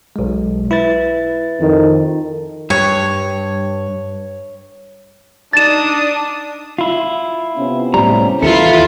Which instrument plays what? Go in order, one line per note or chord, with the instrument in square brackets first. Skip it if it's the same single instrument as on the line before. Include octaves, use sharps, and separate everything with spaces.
[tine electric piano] B1 G#3
E4 B4 A6
[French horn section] F2 D#3
[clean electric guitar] G2 [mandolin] C#5
[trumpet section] D4 [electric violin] D#4 D#6 [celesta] A6 E7
[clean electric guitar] E4 F4
[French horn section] C3 B3 C#4
[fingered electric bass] A2 G3 [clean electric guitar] A#5
[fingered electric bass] D#2 E3 [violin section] E4 F4 [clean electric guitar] A4